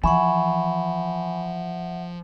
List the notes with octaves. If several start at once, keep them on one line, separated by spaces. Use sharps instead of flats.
E3 F3 E5 F#5 G#5 B5 C#6